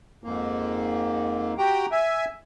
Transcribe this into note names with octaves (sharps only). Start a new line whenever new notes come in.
F2 G#2 A#3
F#4 G4 G5 A#5
E5 G#5